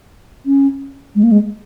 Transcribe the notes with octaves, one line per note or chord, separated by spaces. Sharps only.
C#4
G#3
A#3
G#3